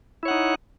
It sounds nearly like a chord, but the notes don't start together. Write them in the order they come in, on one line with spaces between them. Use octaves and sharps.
E4 C#5 F#5 D#4